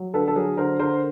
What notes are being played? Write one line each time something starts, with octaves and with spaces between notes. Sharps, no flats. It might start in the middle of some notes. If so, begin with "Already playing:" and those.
Already playing: F#3
D3 A4 B4
A4
F#3 G#4 A#4
D3 A#4 C5
D3 A#4 C5